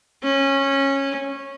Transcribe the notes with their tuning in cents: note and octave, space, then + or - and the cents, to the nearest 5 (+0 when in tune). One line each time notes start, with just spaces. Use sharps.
C#4 -15